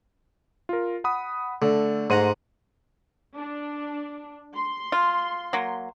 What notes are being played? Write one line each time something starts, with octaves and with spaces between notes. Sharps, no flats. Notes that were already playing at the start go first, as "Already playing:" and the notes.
F4 A#4
F#5 B5 D#6
D3 A3 A4
G#2 A3 F#5 A#5 C6 D#7
D4
C6
F4
F#3 A#3